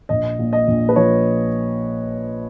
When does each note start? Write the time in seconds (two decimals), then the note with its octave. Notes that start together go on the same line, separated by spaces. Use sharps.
0.09 A#1 D#5
0.39 A#2
0.53 D#5
0.68 A#1
0.89 B4
0.96 F3 C#5